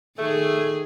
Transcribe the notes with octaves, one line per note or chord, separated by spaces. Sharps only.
D#3 A3 G#4